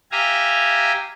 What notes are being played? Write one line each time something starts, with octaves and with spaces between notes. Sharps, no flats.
G4 E5 F5 G#5 A#5